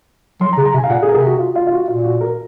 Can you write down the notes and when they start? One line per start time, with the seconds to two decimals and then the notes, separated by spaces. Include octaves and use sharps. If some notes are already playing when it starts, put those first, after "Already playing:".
0.41 F#3 C6
0.53 A#5
0.58 C#3
0.66 A#5
0.74 C3
0.78 G#5
0.84 F5
0.90 A#2 F#5
1.02 G#4
1.09 A#4
1.14 C3 G#4
1.26 F#4
1.38 F4
1.55 F4
1.67 F4
1.72 F#4
1.88 A#2 F4
2.04 F#4
2.21 A#4